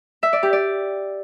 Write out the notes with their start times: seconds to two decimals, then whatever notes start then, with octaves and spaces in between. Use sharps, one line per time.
0.23 E5
0.33 D5
0.43 G4
0.53 D5